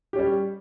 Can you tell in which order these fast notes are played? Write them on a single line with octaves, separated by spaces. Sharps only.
G4 C#4 G3